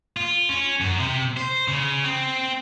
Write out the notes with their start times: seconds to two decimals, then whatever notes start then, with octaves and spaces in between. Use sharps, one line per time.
0.17 F4
0.49 C#4
0.81 F#2
0.99 C3
1.37 C5
1.68 C#3
2.04 C4